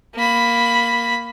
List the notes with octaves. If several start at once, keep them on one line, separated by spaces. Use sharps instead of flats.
A#3 B5